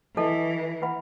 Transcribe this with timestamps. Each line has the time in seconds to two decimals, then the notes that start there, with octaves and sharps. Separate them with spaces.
0.16 E3 A4 D#5 A5
0.82 E4 B4 F#5 B5